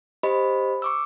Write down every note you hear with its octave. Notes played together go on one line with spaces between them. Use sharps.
G4 C5 D#5 B5
C#6 D6 E6